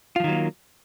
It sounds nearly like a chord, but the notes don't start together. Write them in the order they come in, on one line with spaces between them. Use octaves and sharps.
F4 F3 D#3 F#3 A#3